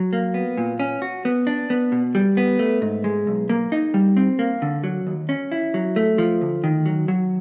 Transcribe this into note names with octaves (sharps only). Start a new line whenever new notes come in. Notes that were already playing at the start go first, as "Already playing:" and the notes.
Already playing: F#3
A#3
B3
A#2
C#4
F#4
B3
D4
B3
B2
G3
B3
A3
G#2
G#3
B1
A#3
D#4
G3
C4
A#3
D3
F#3
D#2
C#4
E4
F#3
A3
F3
D2
D#3
F#3
F#3